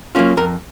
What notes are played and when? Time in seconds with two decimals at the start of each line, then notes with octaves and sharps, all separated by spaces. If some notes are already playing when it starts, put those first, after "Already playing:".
0.15 F#3 A#3 C#4 F4
0.37 F2 A#4